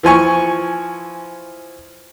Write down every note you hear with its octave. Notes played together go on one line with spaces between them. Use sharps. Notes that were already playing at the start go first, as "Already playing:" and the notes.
E3 F3 G#5 C#6